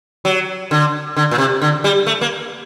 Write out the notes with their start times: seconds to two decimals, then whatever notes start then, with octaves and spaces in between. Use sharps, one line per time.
0.25 F#3
0.71 D3
1.16 D3
1.31 A#2
1.38 C3
1.62 D3
1.84 G3
2.07 A3
2.21 A#3